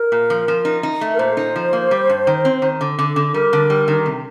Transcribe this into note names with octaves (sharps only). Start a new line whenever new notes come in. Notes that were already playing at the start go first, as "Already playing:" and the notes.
Already playing: A#4
A#2
F3
F3
D#4
D#4
A3
A#4
A#2 C5
D#4
F3
A#3
G3
G2
D#3
C4
D#3
D3
D3
D3
G3 A#4
D3
G3
D#3
C3